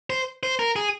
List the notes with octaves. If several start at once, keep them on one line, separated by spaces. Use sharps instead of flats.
C5
C5
A#4
G#4